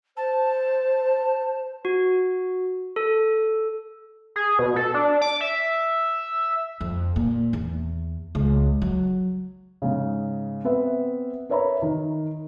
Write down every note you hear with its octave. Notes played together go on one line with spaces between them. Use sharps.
C5 A5
F#4
A4
G#4
B2
A4
D4
D6
E5
F2
A#2
E2
C#2
F#3
G#2 C#3
B3 C4 B4 E5
A#4 B4 C#5 E5 A#5 B5
D#3